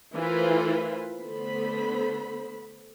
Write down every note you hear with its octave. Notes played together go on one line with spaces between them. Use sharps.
E3 A3 F4 A#4 C5 B5
D3 A3 B3 C5 B5